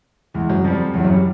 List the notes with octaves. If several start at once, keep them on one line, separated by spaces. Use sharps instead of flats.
E2 E3 G#3
F#2 F#3
F2 F3 G3
E2 E3 F#3
F#2 F#3
G3